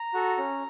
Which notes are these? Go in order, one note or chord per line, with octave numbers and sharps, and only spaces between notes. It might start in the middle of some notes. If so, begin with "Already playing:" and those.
Already playing: A#5
F#4 A4
C#4